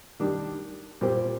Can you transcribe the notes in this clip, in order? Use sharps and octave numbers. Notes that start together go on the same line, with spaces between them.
D#3 G3 D4 G4
A#2 G3 C4 G4 C5